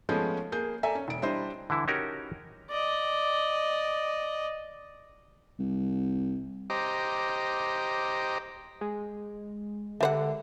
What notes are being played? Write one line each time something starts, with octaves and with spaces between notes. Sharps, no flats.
F3 G#3 A3 B3 C#4
A#3 G#4 G6
A4 D5 E5 G#5 A#5
C#4
E1 D7
G3 D4 E4 C5 D#5
D3 E3 E4
C#4 D#4 F#4 G4 A#4
D5 D#5
C2
G4 C5 D#5 A#5 D6
G#3
D3 G3 C5 E5 F#5